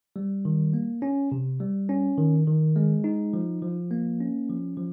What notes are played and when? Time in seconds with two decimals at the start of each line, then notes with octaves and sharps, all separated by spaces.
0.16 G3
0.45 D#3
0.73 A#3
1.02 C#4
1.32 C3
1.60 G3
1.89 C#4
2.18 D#3
2.47 D#3
2.76 G#3
3.04 D#4
3.33 F3
3.62 F3
3.91 A#3
4.20 C#4
4.49 F3
4.77 F3